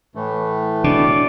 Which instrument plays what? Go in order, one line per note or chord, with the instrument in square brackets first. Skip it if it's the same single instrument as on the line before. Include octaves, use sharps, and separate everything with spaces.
[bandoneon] A2 E3 A3
[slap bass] B2 [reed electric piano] D4 [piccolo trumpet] D5